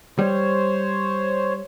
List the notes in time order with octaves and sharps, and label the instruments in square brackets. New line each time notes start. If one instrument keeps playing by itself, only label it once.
[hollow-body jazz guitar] G3 [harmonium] C5 C#5